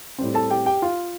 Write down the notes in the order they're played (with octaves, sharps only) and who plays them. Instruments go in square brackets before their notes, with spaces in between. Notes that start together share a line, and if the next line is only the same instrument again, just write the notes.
[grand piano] A2 G3 C4
A4 A5
G4 G5
G4 G5
F4 F5